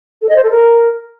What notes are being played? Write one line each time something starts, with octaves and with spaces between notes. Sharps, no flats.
A4
D#5
C5
A4
A#4